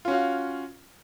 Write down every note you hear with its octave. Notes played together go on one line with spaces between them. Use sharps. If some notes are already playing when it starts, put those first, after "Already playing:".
C#4 F4 F#4 F5